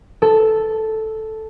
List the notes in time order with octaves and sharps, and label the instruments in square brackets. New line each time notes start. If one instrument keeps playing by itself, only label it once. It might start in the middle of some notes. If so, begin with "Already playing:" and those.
[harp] A4